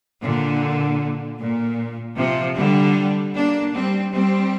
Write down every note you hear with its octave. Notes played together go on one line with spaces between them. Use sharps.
A#2 D3
A#2
C3 F3
D3 G3
A#3 D4
G3 C4
G3 C4